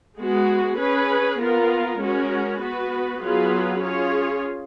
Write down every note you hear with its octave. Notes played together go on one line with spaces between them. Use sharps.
G#3 B3 F#4
C#4 G#4 B4
B3 F4 A#4
G#3 C#4 F#4 A#4
B3 F#4 B4
F#3 B3 F4 G#4 B4
C#4 F4 G#4 C#5